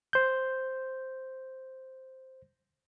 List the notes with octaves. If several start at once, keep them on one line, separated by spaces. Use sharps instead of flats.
C5 G6